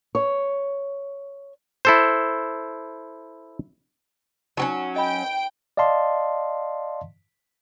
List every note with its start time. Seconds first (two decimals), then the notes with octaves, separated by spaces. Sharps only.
0.15 C#5
1.85 E4 A4 C5
4.57 F#3 C4 C#4 D#4
4.96 D#5 G5 B5 D7
5.77 D5 D#5 F5 A5 C6